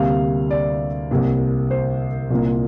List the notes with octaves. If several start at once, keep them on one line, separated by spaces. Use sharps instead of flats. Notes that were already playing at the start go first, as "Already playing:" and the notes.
Already playing: D2 C3 G3 A#3 F5
D5
C2 C3 A#3
C5
C2 A#2 A#3